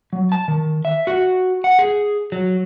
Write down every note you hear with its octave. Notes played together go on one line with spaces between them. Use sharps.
F#3
A5
D#3
E5
F#4
F#5
G#4
F#3